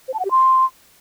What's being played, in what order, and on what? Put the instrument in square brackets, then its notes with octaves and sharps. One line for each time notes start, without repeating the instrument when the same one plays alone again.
[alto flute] C5
A5
F#5
G4
C6